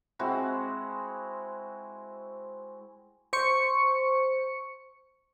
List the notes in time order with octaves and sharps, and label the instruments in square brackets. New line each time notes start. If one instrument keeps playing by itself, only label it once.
[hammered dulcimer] G#3 C4 E4 F#4
[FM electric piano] C5 C#6 C#7